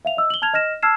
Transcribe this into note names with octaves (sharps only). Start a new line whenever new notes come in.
E5 F5 F7
D#5 E6
F#7 G7
A5 F6 G#6 F7
D#5 F6 A#6 E7
A5 E6 F6 G#6 C7 E7